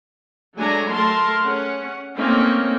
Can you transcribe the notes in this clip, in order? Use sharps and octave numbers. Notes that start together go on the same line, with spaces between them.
F#3 G#3 A3 D4 G#5 A#5
A3 A4 A#4 A5 C6
C#4 G#4 F#5
A3 A#3 C4 C#4 D#4